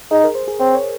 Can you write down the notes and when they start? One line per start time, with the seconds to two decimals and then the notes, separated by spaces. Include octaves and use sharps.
0.11 D#4 G#4
0.24 A#4
0.35 C5
0.48 G#4
0.60 C4 C#5
0.74 C#5